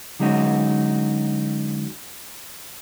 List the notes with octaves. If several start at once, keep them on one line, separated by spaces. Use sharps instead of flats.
D3 F#3 G#3 C#4 D#4 F#4